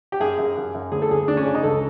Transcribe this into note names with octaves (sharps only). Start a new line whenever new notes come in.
G4
F#2 G#4
F#2
F#2
F#2
D2 G#4
A4
D2 G#4
D2 D4
C#4
C#3 D4
D#4
C#2 A4